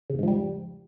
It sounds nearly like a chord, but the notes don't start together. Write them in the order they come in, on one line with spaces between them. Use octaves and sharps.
C#3 E2 G#2 F3 G3